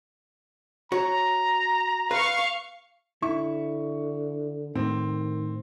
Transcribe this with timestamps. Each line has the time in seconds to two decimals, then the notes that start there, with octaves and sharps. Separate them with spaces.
0.92 F#4 C#5 A#5
2.11 B4 F5 C#6
3.22 D3 E4 C#6
4.75 A2 D#3 C4